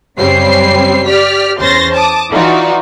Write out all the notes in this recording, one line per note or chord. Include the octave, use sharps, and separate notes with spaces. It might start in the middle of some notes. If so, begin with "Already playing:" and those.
F#2 C#3 G3 C4 C#5 C7
G4 D5 F6 B6
E2 C#4 C5 C6 A6 A#6
A5 D6 D#6
E3 D#4 F4 F#4 D5